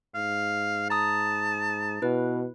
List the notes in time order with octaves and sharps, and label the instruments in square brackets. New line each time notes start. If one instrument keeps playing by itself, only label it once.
[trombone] G#2 [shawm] F5
[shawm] A5 [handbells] A#5 D#6
[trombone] B2 [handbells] E4 B4